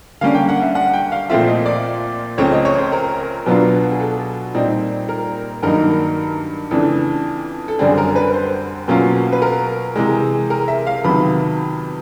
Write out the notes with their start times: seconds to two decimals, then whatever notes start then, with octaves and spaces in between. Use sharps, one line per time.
0.21 D3 G3 A#3 C#4 F5
0.35 G5
0.49 F#5
0.62 E5
0.75 F#5
0.93 G5
1.12 F5
1.30 A#2 F3 A3 C4 F4 E5
1.48 D#5
1.66 D5
2.38 C#2 C#3 F3 A3 C4 C#5
2.52 D#5
2.65 C#5
2.78 C5
2.92 A#4
3.46 B2 F#3 B3 D4 F4
3.92 G#4
4.00 A4
4.54 A#2 G3 C4 D#4
5.09 A#4
5.63 G2 D#3 F#3 A#3 D#4 A#4
6.71 F2 C#3 E3 A3 D4 A4
7.68 A4
7.79 F#2 D3 G3 C4 G#4
7.98 A#4
8.16 B4
8.34 C5
8.88 B2 F#3 A#3 C#4 F4
9.32 B4
9.42 A#4
9.96 C3 E3 G#3
10.50 A#4
10.68 E5
10.87 F5
11.04 F2 C3 D#3 F#3 B3 B5